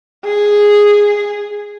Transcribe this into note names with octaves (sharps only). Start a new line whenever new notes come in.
G#4